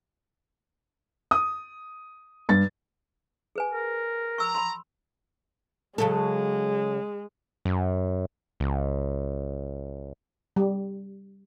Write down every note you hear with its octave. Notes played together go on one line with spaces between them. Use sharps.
D#6
G2 A6
G#4 B4 G#5
A#4
A#5 C#6 E6
B5 C6
C#3 F#3 G#3 A4
F#2
C#2
G3